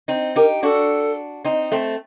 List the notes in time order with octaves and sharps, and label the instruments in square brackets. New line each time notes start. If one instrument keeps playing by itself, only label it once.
[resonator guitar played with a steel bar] C4 D#4
[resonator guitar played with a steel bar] D#4 G4 [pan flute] A#4
[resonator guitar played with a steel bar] D4 F#4 [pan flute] A4
[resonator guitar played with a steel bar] C4 D#4
A3 C4